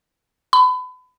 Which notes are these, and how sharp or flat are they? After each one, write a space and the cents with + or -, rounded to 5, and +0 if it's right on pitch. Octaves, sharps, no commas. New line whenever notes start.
B5 +35